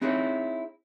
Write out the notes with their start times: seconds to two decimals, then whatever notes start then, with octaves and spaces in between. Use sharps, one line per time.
0.01 C4 D#4 E4 G#4 C#5